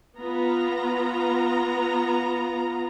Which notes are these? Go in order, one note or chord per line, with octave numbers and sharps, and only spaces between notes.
B3 F4 A#5